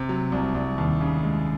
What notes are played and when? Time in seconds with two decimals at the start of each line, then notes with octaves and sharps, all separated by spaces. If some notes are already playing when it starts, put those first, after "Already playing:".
Already playing: C3
0.09 F#3
0.32 C2
0.55 C2
0.78 D#2
1.00 C#3
1.23 G#3